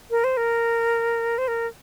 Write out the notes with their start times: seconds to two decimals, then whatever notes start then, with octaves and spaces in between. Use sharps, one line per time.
0.11 A#4
0.24 C5
0.37 A#4
1.38 C5
1.48 A#4